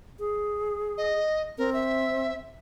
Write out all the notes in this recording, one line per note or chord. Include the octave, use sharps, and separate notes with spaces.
G#4
D#5
C4 A#4
E5